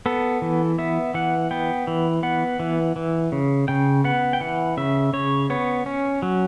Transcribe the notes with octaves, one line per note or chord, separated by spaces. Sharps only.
B3 A4
E3
B3 E5
E3 F#5
B3 G5
E3
B3 F#5
E3
E3
C#3
C#3 G5
B3 F#5
G5
E3 F#5
C#3 E5
C#3 C#5
B3 C#5
C#4
F#3